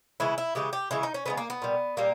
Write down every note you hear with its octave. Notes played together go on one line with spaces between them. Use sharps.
C#3 E3 G#3 E4
E4
C#3 E3 G#3 G4
G4
C#3 E3 G#3 E4
D#4
C#4
C#3 E3 G#3 B3
A#3
B3
A#2 G3
A#2 G3 A#3